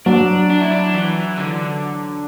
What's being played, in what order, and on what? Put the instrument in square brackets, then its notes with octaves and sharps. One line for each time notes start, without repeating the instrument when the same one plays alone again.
[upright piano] F#3 [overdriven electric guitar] D4
[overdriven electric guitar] D4
E4
D4
E3
D3